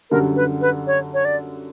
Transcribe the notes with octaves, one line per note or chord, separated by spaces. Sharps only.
F#2 D3 G3 A#4
B4
B4
C#5
C#5
D5